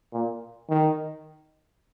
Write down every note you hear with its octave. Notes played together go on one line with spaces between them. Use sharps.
A#2
D#3